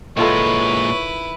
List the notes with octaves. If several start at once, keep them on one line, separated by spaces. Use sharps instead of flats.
A#2 D#3 G#3 E4 F4 A4 B4 C#5